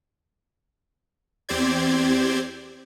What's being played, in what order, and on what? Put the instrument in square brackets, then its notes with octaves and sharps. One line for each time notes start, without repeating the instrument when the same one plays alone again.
[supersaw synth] E2 C4 G4 C5 D5 G#6